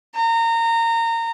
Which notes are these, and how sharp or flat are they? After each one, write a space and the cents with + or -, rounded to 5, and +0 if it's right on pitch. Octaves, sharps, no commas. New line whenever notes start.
A#5 -25